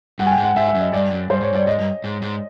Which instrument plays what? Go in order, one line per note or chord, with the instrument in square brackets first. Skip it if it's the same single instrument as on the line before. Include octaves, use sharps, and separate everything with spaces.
[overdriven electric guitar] G2 [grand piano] F#5
[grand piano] G#5
G5
[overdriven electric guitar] G#2
[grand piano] F#5
[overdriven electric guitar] G#2 [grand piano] E5
[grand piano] E5
[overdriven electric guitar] F#2
[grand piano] D#5
[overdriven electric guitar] G2 [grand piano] D5
[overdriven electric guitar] F#2
[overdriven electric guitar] G2 [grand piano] C5
[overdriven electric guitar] G#2 [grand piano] C#5
[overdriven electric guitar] G2 [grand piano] D5
[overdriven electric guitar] G#2 [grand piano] D#5
[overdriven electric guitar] G2
G#2
G#2